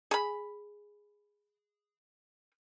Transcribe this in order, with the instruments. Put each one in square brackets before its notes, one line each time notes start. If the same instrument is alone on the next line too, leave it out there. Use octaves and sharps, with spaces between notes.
[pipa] G#4 B5